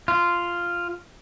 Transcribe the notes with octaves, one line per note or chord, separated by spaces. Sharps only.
F4